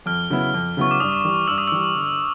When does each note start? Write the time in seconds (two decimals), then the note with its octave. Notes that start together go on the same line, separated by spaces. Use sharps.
0.06 F2 F6
0.30 C#3 F#3 B3 E4
0.54 F2
0.77 C#3 F#3 B3 E4 C#6
0.91 D6
1.00 G2 D#6
1.24 E3 G3
1.48 G2 E6
1.58 D#6
1.68 E3 G3 E6
1.96 G1